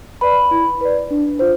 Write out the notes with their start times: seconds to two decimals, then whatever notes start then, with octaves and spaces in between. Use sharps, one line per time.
0.21 B4 D5 B5
0.51 E4
0.81 B4 D5
1.11 D4
1.39 F4 C5